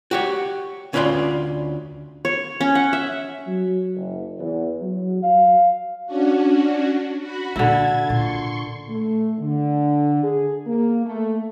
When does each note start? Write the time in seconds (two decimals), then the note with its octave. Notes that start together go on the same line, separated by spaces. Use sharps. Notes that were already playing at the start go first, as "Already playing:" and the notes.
0.11 F#4 G4 C#5
0.93 D2 C#4 F4 B4 D5 C6
2.25 C#5
2.61 C#4
2.75 F#5
2.93 E5
3.47 F#3
3.95 F#1
4.39 E2
4.82 F#3
5.23 F5
6.06 C#4 D4 F#4
7.19 F#4 B5
7.56 A#2 D3 A#3 E4 G#6 A6
8.10 A#2 C6 C#6
8.88 A3
9.39 D3
10.23 G#4
10.67 A#3
11.06 A3